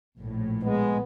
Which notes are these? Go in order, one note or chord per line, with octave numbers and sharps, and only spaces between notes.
A#1 A2
G#3 B3